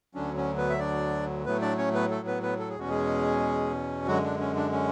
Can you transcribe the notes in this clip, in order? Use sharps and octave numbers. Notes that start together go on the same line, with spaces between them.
D2 D3 F#3 C#4 D4
C#4
B3 B4
E5
D4 D5
A2 F#3 A3 B3 B4
D4 D5
C#4 C#5
B3 B4
A3 A4
B3 B4
B3 B4
A4
G#4
E2 B2 G#3 C#4 F#4
G#3 G#4
F#2 D3 F#3 G#3 F#4
D4
C#4
D4
C#4